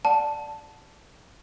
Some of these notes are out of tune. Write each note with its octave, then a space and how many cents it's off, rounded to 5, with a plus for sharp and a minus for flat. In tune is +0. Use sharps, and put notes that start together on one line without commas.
D5 +0 F#5 -20 A5 +0